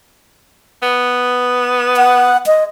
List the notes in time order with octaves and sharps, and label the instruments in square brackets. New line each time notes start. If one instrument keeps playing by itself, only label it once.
[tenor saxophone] B3
[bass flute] F#5
D#5